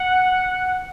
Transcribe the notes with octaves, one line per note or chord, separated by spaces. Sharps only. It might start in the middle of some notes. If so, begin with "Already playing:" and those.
Already playing: F#5